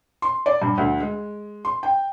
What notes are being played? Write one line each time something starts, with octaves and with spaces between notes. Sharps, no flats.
C6
D5
G2
D2
G#3
C6
G5